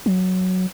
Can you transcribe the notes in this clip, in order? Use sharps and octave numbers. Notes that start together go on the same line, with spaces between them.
F#3